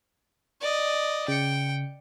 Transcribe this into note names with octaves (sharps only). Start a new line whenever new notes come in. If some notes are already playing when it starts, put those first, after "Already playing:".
D5 D#5
C#3 G5 C#7